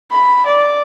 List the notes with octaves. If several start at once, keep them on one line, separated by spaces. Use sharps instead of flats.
B5
D5